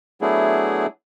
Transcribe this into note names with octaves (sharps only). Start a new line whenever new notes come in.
F#3 A3 B3 D4 E4 G#4